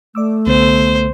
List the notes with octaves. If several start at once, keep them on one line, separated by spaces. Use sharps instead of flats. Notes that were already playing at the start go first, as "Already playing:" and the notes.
A3 D5 D6 E6
C2 D3 B3 C5